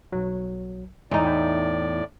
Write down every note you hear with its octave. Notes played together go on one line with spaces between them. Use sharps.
B1 F#3
E2 A2 D#4 D5
E4 G5